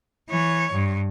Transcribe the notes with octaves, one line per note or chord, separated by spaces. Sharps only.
E3 C#5
G2